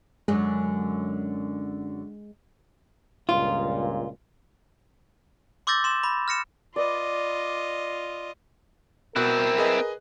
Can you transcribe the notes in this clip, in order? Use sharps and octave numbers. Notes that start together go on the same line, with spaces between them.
F#2 D3 G#3
C#2 G2 A#2 F4
C6 D6 E6 G6 A6 A#6
C6 E7
B5
F6 A#6 C#7 E7
F4 B4 D5 D#5
B2 C4 E4 A#4 F#6
G#4 B4 D#5